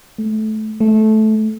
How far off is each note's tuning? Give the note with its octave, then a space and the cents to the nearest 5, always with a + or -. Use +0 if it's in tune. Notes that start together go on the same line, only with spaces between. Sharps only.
A3 -20
A3 -15